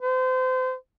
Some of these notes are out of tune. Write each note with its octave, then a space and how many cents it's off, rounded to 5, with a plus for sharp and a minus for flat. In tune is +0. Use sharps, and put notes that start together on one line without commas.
C5 -35